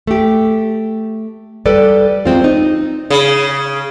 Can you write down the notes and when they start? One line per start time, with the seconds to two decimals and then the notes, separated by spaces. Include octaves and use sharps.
0.07 A3 G4
1.66 G3 A4 B4 D5
2.25 F#3 G#3 C4 F4
2.44 D#4
3.10 C#3